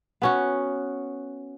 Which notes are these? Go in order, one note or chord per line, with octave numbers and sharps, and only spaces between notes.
B3 C#4 F#4